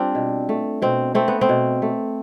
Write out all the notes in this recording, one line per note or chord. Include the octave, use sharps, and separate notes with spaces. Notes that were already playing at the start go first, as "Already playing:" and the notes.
Already playing: G3 C4 D4 F4
B2
A3
B2 C4
A3 C4
B3
C4
B2
A3